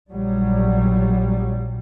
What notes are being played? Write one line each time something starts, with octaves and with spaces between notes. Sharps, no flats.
A#1 F#3 G3